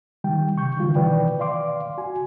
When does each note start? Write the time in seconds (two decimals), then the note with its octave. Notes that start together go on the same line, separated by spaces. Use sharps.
0.24 D#3 G3 G5
0.57 C3 C#6 G6
0.77 D3 E3 G3 F4
0.96 B2 D#3 E3 B4 D5 G5
1.40 D5 F5 C6 D6
1.98 F#4 G#5